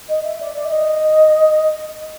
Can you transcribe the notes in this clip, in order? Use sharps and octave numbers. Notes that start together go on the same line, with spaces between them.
D#5
E5
D5
D5
E5
D#5